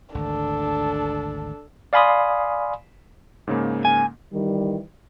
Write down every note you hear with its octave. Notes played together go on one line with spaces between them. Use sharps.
G#1 D2 D4 A4
D5 F5 G#5 B5 C6 D#6
G#2 C#3 A#3
G#5
D#3 E3 G3